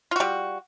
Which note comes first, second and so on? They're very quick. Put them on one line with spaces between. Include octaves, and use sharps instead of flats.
F4 F#4 G3